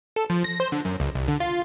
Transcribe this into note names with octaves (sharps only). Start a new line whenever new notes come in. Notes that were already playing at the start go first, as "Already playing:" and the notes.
A4
F3
A#6
C5
D3
F#2
C#2
C2
D3
F4